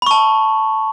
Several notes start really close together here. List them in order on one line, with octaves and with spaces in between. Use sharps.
B5 C#6 A5